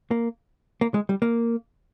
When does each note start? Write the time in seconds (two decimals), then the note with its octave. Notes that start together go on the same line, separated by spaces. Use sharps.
0.11 A#3
0.81 A#3
0.94 G#3
1.09 G3
1.22 A#3